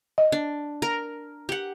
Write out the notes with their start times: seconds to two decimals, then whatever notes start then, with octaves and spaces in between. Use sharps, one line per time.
0.18 D#5
0.32 D4
0.82 A#4
1.49 G4 F#5